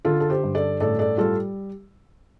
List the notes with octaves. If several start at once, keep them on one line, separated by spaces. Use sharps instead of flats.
D3 F4 A4
A4
G4 C5
G2
A4 D5
A2 A4 D5
A4 D5
G3 F4 A4